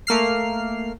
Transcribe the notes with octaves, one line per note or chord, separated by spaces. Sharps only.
A3 A#3 F6 C7